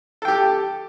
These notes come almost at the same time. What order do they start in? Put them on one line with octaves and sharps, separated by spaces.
A4 G5 G4